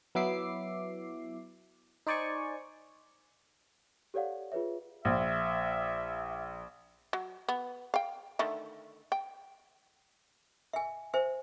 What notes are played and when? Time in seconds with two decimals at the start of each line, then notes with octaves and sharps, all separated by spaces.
0.15 F#3 B3 E4 E5 D6 C7
2.07 D#4 C5 D5 G#5 C#6
4.14 G4 A4 C#5 D5 F5 F#5
4.52 F4 G#4 B4 C#5 E5
5.05 A#1 E5
7.13 F#3
7.49 B3
7.94 F5 G5
8.39 D3 D#3 A3
9.12 G5
10.73 E5 G#5
11.14 C5 E5 G#5